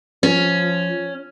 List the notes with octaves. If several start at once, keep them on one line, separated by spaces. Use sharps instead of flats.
F3 C#4